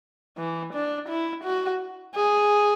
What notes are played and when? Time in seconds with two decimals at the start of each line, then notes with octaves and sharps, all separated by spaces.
0.38 E3
0.74 D4
1.08 E4
1.44 F#4
2.16 G#4